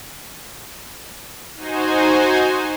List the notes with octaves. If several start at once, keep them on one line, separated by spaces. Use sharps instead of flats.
D#4 F#4 C5 G#5